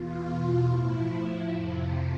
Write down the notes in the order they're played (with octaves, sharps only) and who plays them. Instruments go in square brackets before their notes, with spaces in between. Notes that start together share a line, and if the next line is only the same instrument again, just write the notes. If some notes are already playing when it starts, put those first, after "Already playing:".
Already playing: [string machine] E2 B2 F4
A2 F3 E4
F2 C3 F3